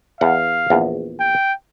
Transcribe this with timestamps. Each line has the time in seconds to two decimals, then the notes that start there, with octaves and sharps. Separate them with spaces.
0.21 E2 F5 F#5
0.70 A#1 E2
1.20 G5